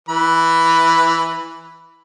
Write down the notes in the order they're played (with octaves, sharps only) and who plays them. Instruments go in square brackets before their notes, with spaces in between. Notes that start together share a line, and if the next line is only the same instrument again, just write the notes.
[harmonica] E3 B4 B5